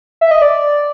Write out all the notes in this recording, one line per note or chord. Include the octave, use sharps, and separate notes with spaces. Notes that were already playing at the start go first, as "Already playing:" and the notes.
E5
D#5
D5